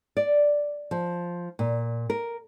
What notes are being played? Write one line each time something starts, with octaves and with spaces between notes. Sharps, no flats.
D5
F3
A#2
A#4